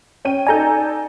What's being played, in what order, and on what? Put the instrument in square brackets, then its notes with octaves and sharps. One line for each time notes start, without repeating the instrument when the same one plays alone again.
[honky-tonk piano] C#4 G5 D#7
[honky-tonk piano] D#4 A4 D5 [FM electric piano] G#5 A#5 G6